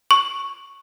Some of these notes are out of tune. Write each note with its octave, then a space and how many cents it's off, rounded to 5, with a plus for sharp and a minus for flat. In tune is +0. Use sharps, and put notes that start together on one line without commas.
C#6 -5